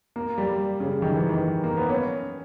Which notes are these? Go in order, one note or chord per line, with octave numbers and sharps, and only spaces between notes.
A#3
G3
C#3
D#3
E3
D#3
A#3
B3
C#4